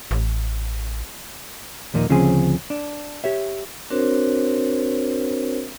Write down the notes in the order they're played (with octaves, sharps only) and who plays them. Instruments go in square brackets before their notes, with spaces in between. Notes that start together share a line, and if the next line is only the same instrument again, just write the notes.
[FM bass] A1
[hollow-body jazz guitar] D#2 A#2 F3 A#3 D#4
D2 C#3 F3 C4 C#4 G#4
D4
G4 C#5 E5
[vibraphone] C4 D4 F#4 A#4 C5 C#5